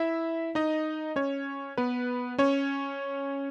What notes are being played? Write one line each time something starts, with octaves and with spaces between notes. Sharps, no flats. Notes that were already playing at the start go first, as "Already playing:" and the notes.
Already playing: E4 E5
D#4 D#5
C#4 C#5
B3 B4
C#4 C#5